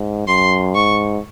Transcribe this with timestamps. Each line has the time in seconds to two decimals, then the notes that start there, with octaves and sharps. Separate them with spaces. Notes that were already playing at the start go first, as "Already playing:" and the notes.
Already playing: G#2
0.27 F#2 C6
0.75 G#2 C#6